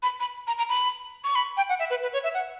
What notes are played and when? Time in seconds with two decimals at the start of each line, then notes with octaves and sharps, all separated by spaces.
0.03 B5
0.20 B5
0.47 A#5
0.58 A#5
0.69 B5
1.24 C#6
1.35 B5
1.57 G5
1.69 F#5
1.79 E5
1.90 B4
2.02 B4
2.13 C#5
2.24 E5
2.34 F#5